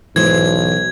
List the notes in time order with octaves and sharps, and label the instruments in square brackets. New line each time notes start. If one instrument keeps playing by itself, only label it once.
[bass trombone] B1 [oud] G#2 C5 [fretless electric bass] E3 [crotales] G#6